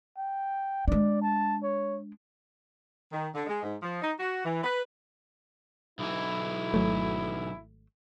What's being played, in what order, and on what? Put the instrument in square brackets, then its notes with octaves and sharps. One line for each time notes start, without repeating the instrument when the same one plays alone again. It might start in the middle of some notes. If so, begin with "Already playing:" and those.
[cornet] G5
[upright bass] G#3 D4 [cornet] D5
[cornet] A5
C#5
[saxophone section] D#3
D3
G#3
G#2
F3
D#4
F#4
E3
B4
[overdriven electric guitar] B1 E3 [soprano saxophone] E4
[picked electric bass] G#1 F#3 A3